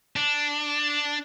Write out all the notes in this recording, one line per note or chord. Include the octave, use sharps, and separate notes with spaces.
D4